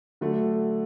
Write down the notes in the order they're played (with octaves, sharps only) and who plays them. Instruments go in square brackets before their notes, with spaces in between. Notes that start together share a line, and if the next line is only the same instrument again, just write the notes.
[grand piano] D3 F#3 A3